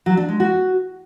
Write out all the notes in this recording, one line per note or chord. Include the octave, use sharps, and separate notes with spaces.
F#3
D4
G#3
F#4